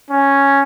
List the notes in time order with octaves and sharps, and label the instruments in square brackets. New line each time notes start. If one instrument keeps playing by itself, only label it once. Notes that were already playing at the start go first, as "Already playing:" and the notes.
[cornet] C#4